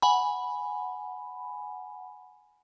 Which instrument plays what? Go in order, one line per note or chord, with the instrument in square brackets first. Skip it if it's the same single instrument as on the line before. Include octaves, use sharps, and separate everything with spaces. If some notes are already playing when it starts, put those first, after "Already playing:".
[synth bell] F#5 G#5 B5